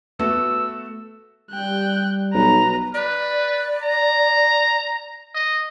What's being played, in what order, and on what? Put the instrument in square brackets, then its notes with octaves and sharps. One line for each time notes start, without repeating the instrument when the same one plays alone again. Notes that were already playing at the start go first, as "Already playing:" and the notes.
[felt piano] A3 F#4 A4 [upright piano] B3 [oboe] E6
[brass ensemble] G3 [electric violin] G5 F#6
[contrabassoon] B1 [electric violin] B4 A#5
[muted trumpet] B4 [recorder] D5
[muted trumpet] A#5
D#5